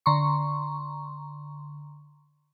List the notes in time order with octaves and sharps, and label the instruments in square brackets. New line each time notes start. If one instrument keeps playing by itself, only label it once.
[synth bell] D3 A#5 C6 C#6